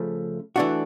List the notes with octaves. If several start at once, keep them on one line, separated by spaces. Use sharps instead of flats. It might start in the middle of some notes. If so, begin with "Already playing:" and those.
Already playing: C#3 F3 A3
E3 A3 D4 F#4